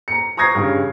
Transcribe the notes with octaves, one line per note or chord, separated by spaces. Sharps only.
A#5 C#7
A#5 C#6 D#6 G#6 A#6 C7
G2 C#3